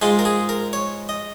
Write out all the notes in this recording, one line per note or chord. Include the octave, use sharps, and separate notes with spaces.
G#2 G#3 F4 G#4
A#4
G#4
A#4
C#5
D#5